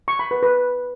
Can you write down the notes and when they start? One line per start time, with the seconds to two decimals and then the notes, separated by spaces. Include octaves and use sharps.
0.08 C#6
0.19 B5
0.31 B4
0.43 B4